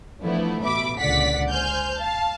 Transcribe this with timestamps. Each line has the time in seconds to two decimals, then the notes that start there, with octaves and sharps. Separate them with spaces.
0.23 E3 F3 A3 B3 D4 E4
0.63 A1 B2 E5 B5 D6
0.99 C#2 A#2 D3 D5 F#5 B6
1.50 C5 G#5 F6 G6
1.98 F5 A5